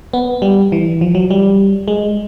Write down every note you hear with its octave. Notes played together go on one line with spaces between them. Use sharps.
B3
G3
E3
F3
F#3
G3
G#3